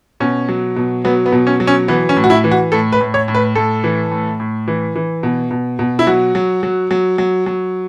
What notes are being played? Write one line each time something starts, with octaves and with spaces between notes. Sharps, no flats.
B2 C#4
F#3
B2
F#3 B3
B3
B2
C#4
F#3
C#4
E3 B3
C#4
A2
F#4
E4
E3
F#4
A2 A4
B4
A2
C#5
A2
B4
A2 A4
E3
A2
A2
E3
E3
B2
B2
B2
E4
F#3 F#4
F#3
F#3
F#3
F#3
F#3